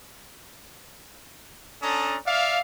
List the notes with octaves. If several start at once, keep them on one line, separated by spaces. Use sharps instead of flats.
C#4 D4 A4 A#5 D#6
D5 E5 F5